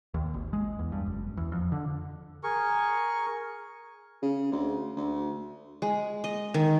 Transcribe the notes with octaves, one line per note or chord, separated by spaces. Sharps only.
D#2
G#1
G#3
E2
G2
F#1
E2
F2
D3
G#4 A#4 C#6
C#3
D2
D2
G#3
D#5
D#3